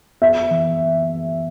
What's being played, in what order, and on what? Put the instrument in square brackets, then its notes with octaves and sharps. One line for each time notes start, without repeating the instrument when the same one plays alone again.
[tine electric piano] B3 [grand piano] E5
[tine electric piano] E3